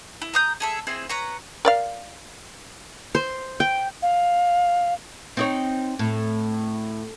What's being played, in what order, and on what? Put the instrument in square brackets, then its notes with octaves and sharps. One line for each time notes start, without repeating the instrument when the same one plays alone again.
[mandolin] E4
A#5 D#6 G6
G#4 A4 E5
C4 E4 G#4
B4 C#5 A#5
[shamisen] A#4 D5 F5
[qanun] C5
G5
[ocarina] F5
[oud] C4 D#4 C#5
A2